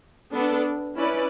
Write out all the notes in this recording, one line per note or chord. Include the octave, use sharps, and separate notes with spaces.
B3 D4 A4
C#4 E4 B4 D5